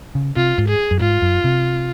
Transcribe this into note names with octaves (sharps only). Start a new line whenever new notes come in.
C#3
C3 F4
G#2
G#4
F#2
G#2 F4
F#2
C3